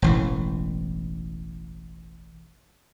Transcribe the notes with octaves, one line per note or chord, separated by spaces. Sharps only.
E1 A1 E3